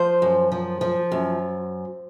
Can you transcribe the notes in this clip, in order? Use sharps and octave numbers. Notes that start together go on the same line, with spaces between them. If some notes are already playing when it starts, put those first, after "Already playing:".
Already playing: F3 C5
F#2
F3
F3
F#2